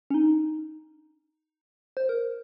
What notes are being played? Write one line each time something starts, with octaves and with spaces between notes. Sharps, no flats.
C#4
D#4
C5
A#4